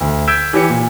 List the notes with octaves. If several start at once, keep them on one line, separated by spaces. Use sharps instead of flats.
D2
E6 G6 G#6 B6 D7 E7
E3 G4 C#5 G#5 C#7
A#2